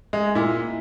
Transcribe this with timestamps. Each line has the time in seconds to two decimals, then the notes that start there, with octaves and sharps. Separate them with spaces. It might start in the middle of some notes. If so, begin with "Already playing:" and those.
0.13 G#3
0.35 A#2 E4